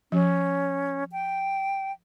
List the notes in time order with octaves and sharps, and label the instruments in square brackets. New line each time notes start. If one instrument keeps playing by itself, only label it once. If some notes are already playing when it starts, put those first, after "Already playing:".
[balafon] F3 [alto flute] C#4
[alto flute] G5